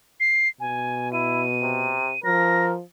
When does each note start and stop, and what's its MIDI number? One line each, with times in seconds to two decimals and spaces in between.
0.20 0.48 96
0.60 2.02 47
0.60 1.12 80
1.13 1.45 64
1.13 2.20 99
1.62 2.13 48
2.24 2.81 53
2.24 2.73 70
2.24 2.66 94